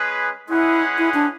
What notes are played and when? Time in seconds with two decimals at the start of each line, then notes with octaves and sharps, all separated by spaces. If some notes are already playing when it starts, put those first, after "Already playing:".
Already playing: G#3 C#4 G#4 B4
0.49 G#3 C#4 E4 G#4 B4 F#5
0.98 E4
1.14 D4